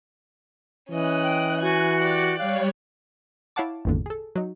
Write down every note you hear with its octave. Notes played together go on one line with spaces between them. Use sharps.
E3 C#4 D#5 F#6
G5
F#4 G#5
G4 D5
G3 C#5 F5
E4 C#5 F5 F#5 A5 D6
G#1 E2 A#2 D3
G#4 A4
F#3 D#4